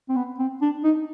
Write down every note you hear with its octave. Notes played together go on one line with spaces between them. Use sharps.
C4
B3
C4
D4
D#4